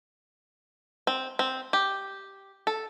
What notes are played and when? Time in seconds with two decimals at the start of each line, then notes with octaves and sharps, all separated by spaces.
1.07 C4
1.39 C4
1.73 G4
2.67 A4